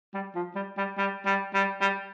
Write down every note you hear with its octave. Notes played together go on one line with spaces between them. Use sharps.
G3
F3
G3
G3
G3
G3
G3
G3